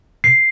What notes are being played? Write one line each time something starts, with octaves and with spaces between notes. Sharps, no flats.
C7